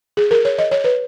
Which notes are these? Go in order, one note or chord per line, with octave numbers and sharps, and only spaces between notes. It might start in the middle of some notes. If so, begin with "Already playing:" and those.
G#4
A#4
C#5
D#5
C#5
B4